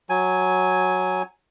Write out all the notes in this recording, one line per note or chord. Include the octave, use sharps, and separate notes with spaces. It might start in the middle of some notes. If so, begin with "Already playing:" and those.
F#3 G#5